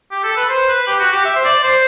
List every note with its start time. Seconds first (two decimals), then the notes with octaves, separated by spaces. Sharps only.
0.11 G4
0.24 A4
0.37 B4
0.49 C5
0.68 B4
0.87 G4
0.99 F#4
1.12 G4
1.25 E5
1.35 C5
1.45 D5
1.63 C5